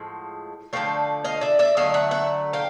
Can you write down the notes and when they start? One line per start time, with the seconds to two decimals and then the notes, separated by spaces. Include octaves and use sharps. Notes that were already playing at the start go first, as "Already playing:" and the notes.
Already playing: A2 F3 G#3 F#5
0.73 D3 F3 A3 F5 G5
1.24 D#5 F5
1.41 D5 E5
1.59 D5 E5
1.77 D3 F#3 A3 D#5 F5
1.94 E5 F#5
2.11 E5 F#5
2.53 F5 G5